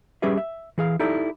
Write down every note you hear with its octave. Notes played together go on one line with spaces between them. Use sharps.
G3 C#4 G4 G#4 B4 E5
E5
E3 G#4 F5
D#4 E4 G4 A4 D5